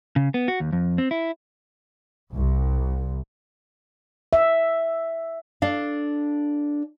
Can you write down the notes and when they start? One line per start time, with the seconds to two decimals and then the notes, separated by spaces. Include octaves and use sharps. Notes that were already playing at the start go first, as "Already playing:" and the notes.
0.16 C#3
0.34 B3
0.48 F#4
0.60 D#2
0.72 F2
0.98 C4
1.11 E4
2.35 C2
4.33 E5
5.62 D4 A4 F5